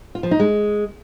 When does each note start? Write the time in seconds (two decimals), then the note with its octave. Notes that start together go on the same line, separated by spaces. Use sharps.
0.15 F4
0.23 F3
0.31 D#4
0.40 G#3